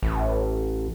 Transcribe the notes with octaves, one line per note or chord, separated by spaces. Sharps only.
A1